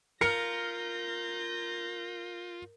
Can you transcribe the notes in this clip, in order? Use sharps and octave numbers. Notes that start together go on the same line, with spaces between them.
F4 A#4 G6 A#6 C#7